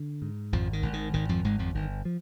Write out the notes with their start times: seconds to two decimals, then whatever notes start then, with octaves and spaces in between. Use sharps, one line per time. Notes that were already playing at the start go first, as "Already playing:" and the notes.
Already playing: D3
0.22 G#2
0.52 G#1 F2 F3
0.73 D#3
0.83 G#1
0.93 D#3
1.14 G#1 D#3
1.29 F2 F3
1.44 G#1 G#2 G#3
1.59 F2 F3
1.75 G1 D#3
2.05 F3